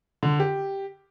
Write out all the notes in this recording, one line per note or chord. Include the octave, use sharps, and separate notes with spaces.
D3
G4